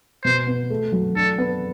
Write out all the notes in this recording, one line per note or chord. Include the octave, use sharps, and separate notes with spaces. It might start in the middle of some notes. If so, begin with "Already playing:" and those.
B2 C5
B3
A3
F#3
D4 A4
B3